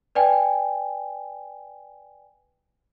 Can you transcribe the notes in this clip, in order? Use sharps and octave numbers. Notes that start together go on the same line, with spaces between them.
B4 D5 G5 G#5